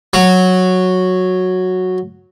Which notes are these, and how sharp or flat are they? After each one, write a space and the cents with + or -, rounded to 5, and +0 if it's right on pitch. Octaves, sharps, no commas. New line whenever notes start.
F#3 -5